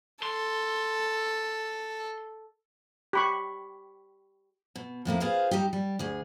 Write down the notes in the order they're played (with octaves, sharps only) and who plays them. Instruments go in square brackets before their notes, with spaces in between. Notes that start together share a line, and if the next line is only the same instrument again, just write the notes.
[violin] A4 [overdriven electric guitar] C6
[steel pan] G4 B5 C#6
[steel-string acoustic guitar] B2
F2 A2 A#3 E4
F4 G#4 B4 C5 F5
G3 D#4 G4
G3
D2 G#4